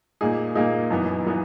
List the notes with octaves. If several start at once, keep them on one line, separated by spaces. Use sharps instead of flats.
A#2 A#3 D#4 G#4
A#2 A#3 D#4 G#4
F#2 E3 B3 D#4
E3 B3 D#4